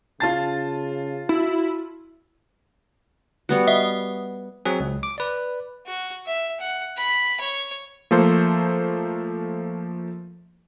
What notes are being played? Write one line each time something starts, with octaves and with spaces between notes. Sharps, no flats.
C#3 F4 A5 A6
E4 F#4
G3 B3 F#4
D#5 E5 D#6
F#3 C4 G#4
C#2
D6
B4 D5
F#4
E5
F#5
B5
C#5
F3 A3 A#3 A4 C5